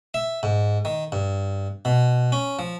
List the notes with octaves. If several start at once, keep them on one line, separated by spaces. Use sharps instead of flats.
E5
G#2
D#3
G2
B2
C#4
F3